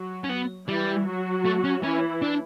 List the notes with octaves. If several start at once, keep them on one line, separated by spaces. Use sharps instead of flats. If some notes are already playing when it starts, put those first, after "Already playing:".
Already playing: F#3 F#4
C#4
B3
E3 G3 E4
F#3 F#4
A3
C#4
E3 C#4 E4
D4